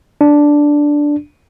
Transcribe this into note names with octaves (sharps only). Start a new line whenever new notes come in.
D4